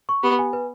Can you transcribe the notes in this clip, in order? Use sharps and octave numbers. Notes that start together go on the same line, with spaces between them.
C#6
B3 G4
G#5
B4